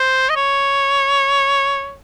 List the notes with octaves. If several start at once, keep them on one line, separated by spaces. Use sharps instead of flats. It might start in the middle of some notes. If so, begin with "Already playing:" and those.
Already playing: C5
D#5
C#5